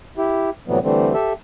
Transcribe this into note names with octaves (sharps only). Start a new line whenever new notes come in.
E4 G4
A2 C3 E3 F#3 G3 B3
D3 E3 G3 A3 C4
G4 A4 E5